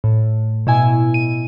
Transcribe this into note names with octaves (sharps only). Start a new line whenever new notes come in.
A2
B2 E4 G#5
D#7